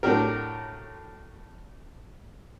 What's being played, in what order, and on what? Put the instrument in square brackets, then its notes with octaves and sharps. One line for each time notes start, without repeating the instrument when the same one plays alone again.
[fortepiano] A2 F#3 D4 G4 A#4